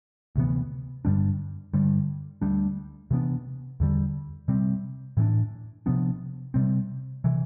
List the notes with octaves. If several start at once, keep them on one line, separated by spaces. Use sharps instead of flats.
D2 C3 E3 B3
G2 D3 G3 D4
G2 D3 G3
D2 D3 G3 D4
C3 E3 B3 D4
E2 D3 G3
C3 G3 C4
A2 E3 B3 D4
C3 F3 B3 D4
C3 G3 C4
C3 E3